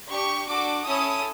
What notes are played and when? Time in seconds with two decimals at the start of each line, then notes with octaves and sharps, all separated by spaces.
0.09 D4 G4 C#6
0.47 D4 F#4 A4 D6
0.84 C#4 E4 A4 D#6